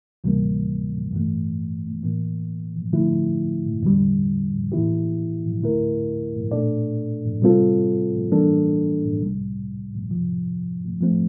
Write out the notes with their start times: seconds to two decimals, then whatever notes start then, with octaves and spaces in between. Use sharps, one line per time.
0.24 D2 C3 E3 G3 A#3
1.13 G2 E3 A3
2.03 A2 E3 A#3
2.93 D3 F3 A3 E4
3.83 E2 D3 G3
4.72 A2 E3 A#3 E4 G4
5.63 D2 D3 A3 E4 A#4
6.51 A#2 A3 D4 A4 D5
7.42 C3 G3 C4 F4 A4
8.31 E3 G3 A#3 D4 A4
9.20 C2 C3 G3
10.11 F2 C3 F3
11.01 F3 A3 C4